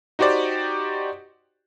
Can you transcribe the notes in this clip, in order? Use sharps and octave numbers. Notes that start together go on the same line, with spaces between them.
D#4 F#4 G4 C5 D5